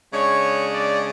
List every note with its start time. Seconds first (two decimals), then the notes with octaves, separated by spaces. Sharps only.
0.13 C#3 G#3 D4 C#5
0.72 D5